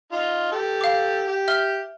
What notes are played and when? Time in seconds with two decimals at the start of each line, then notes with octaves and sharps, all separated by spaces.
0.12 D#4 F4
0.52 G4 A4
0.81 F5 D6
1.27 G4
1.48 E5 F6 G7